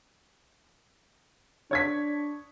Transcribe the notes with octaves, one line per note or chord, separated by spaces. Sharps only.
D4 C#5 G#6 B6